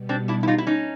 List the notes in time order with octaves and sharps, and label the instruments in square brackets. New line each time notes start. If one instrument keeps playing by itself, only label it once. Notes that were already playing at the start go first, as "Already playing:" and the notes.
Already playing: [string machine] B2 G3 B3
[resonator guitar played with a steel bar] C4 D4
D4 E4
E4
D#4 F4
E4
C#4 D#4